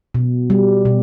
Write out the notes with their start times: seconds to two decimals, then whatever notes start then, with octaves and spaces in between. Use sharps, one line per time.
0.15 B2
0.50 G3
0.85 B2